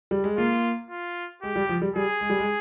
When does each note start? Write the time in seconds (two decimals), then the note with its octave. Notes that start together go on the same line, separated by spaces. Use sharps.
0.11 G3
0.24 G#3
0.38 A#3 F4
0.90 F4
1.42 G#3 G4
1.56 G3
1.69 F3
1.82 G3
1.95 G3 G#4
2.21 G#3
2.30 G3
2.39 G#3